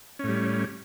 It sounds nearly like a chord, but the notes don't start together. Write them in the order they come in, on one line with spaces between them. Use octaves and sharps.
C#4 A2 G3